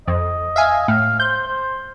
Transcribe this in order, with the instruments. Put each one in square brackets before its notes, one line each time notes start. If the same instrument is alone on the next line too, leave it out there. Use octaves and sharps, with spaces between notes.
[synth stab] F2 [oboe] D#5
[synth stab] E5 F5 G#5
[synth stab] A2 [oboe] F5
[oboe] C5 [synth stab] G6
[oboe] C5